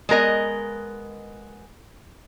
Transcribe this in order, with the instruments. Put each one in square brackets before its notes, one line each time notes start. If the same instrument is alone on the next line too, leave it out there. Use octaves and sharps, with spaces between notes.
[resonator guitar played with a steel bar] G#3 B3 A#4 D#5